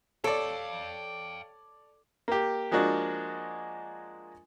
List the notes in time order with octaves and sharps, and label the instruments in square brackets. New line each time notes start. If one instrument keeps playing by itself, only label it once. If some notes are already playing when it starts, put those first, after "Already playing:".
[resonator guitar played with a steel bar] A4 [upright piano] C#5 D5 [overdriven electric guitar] F5 G5
[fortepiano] A#3 G4
F3 G#3 A#3 D4 F#4